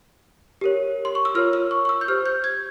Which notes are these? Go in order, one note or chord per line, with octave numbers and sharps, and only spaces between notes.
G4 A#4 C#5
C6
C#6
E6
F4 A#4 C#5 F6
E6
C#6
C#6
E6
G6
G4 C5 F6
G6
G#6